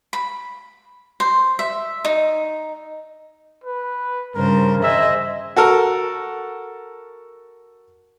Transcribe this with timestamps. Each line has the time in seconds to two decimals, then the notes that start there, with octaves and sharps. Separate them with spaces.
0.13 B5
1.20 C5
1.59 E5
2.05 D#4
3.64 B4
4.35 G2 C#3 A#4 C5
4.83 G#4 C5 D#5 E5
5.56 F#4 A4 A#4